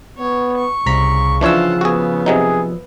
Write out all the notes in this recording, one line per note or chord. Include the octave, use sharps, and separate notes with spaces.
B3 C#5
C#6
C2 C#3 A#5 B6
E3 F3 D4 F4 C#5 F#5 E6
B3 F#4 G#4
C3 F#3 D#4 G#4